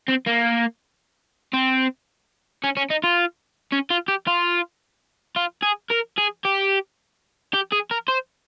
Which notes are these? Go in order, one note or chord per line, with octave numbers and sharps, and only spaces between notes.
C4
A#3
C4
C#4
C#4
D#4
F4
C#4
F4
G4
F4
F4
G#4
A#4
G#4
G4
G4
G#4
A#4
C5